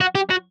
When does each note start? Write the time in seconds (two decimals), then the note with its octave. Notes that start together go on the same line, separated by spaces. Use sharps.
0.01 F#4
0.15 G4
0.30 F#4